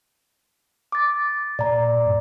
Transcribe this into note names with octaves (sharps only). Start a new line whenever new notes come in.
D6 A6
A#2 D5 A#5
G2